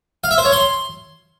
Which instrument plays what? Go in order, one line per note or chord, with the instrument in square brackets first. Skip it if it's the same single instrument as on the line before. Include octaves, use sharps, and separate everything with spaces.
[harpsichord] F5
E5
C5
C#5
C6